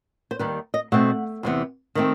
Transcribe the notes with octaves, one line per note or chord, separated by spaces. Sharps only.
C5
D#2 D#3 G3 B4
D#5
B2 A3 C4 F#5
E2 C3 E3 B3
D#3 A3 C4